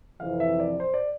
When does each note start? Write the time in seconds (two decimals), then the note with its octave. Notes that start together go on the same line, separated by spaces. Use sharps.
0.20 F2 C3 E3 F5
0.40 E5
0.60 D5
0.80 C5
0.94 D5